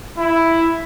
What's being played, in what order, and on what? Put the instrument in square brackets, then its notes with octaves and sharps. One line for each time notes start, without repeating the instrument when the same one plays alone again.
[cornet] E4